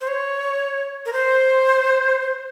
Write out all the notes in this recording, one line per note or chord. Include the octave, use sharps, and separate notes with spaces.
C5
C#5
A#4
C5